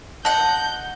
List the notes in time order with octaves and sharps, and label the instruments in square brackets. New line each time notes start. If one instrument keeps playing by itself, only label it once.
[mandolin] D#4 F#5 [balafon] A5 [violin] G6